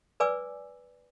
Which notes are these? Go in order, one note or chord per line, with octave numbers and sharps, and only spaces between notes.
B4 D5 G#5 D6 E6